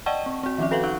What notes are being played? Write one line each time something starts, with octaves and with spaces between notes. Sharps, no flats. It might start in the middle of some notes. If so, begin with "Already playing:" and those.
D5 D#5 F#5 G5 A5 C#6
C4
C4 F#4
D#3 F3 C4 C#4 E5
F#4 A4 B4 F5 F#5
D#4 F#5 C#6 F#6